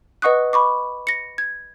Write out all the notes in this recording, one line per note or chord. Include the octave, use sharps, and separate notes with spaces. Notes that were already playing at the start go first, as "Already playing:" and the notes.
B4 D#5 F#5 C#6 D#6 F#6
B5 C#6 D6
A#6 C#7
G#6